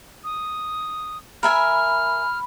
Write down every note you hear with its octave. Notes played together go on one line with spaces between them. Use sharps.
D#6
A#4 E5 G#5 B5 F6